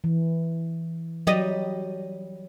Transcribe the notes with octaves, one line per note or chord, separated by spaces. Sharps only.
E3
F#3 G3 D#5